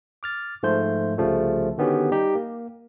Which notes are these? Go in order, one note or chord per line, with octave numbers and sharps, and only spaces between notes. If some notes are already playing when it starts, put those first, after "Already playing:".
D6 F6 A6
G#2 F3 A3 F4 C5 G6
C2 C#3 F3 G3 A3
D3 D#3 B3 C#4 F#4 G4
G3 D#4 G4
A#3